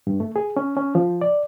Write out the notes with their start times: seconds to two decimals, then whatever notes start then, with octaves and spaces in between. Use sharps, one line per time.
0.07 G2
0.20 A3
0.36 G#4
0.57 C#4
0.77 C#4
0.95 F3
1.21 D5